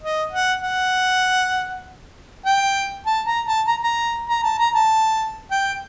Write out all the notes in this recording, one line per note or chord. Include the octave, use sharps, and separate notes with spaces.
D#5
F#5
F#5
G5
A5
A#5
A5
A#5
A#5
A#5
A5
A#5
A5
G5